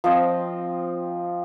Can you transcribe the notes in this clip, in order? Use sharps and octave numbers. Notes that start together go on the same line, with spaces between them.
F3 C4 D#5